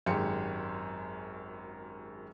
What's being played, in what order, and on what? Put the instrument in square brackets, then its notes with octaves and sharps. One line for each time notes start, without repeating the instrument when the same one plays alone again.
[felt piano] G#1 F#2 G#3 G4 C6 C#7